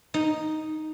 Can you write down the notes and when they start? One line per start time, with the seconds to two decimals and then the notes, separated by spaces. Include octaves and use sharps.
0.14 D#4